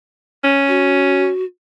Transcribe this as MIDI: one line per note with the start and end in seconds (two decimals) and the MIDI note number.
0.44 1.29 61
0.68 1.44 66